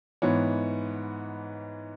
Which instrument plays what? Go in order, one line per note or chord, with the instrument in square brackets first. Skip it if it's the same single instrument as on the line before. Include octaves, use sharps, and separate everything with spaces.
[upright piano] G#2 E3 B3 C#5